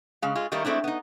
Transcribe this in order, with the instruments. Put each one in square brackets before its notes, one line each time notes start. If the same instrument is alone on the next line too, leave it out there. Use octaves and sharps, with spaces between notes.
[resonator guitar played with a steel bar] C#3 G#3 F5
G#3 F4
D#3 G3 A3 A#3 D#4
G#3 A3 C4 D4 E4
B3 D#4